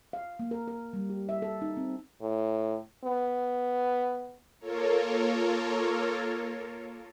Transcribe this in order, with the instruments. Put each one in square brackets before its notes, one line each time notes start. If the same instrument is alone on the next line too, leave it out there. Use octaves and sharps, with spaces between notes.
[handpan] F5
A#3
A#4
A#4
G3
G4
E5
A4
D#4
C4
[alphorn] A2
B3
[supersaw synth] A#3 F4 A4 A#4 C#5